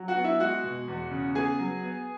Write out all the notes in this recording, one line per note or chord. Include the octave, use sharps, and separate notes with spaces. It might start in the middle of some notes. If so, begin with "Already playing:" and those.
Already playing: F#3
F#4 F#5
B3
E4 E5
G#3 F#4 F#5
B2
E2
C#3
B3 G#4 G#5
F#3
B3